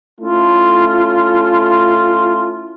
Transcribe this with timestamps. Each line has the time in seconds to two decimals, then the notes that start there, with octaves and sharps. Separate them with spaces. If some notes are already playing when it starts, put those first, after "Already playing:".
0.21 A3 C#4 E4 F4